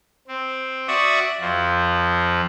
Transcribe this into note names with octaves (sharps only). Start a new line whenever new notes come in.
C4
F#4 D5 E5 C#6 D#6
F2 F3